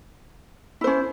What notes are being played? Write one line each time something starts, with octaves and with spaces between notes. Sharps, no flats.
C#4 E4 C5